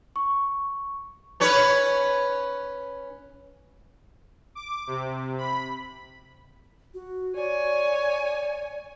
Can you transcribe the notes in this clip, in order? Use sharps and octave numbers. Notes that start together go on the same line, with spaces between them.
C#6
C#4 B4 C#5
D6
C3
B5
F#4
C#5 D5 G#5